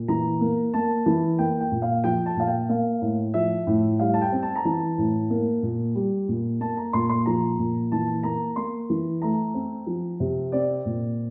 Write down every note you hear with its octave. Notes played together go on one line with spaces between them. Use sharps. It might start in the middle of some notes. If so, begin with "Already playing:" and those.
Already playing: A#2
E3 A#5
A#3
A#3 A5
E3
A#3 G5
G5
A#2
F5
F3 G5
A5
A#2 F5
G5
A#3 F5
A2
F3 E5
A2
G3 F5
A5
G5
C4
A5
A#5
E3 A5
A2
A#3
A#2
G3
A#2
A#3 A5
A#5
A#2 C6
C6
F3 A#5
A#2
E3 A5
A#3 A#5
A#3 C6
E3
A3 A#5
C4
F3
C3
C4 D5
A#2